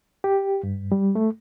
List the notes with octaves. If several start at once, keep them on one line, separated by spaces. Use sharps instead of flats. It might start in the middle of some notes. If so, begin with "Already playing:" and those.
G4
G2
G3
A3